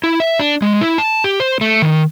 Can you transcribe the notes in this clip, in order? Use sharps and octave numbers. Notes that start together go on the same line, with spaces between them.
E4
E5
D4
G#3
E4
A5
G4
C5
A3
D#3